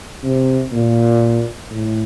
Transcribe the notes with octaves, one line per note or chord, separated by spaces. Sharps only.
C3
A#2
A2